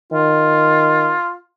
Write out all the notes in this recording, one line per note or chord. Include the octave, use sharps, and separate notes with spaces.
D#3 F4